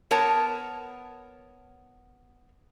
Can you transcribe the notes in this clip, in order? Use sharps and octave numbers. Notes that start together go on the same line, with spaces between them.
B3 A#4 C#5 A5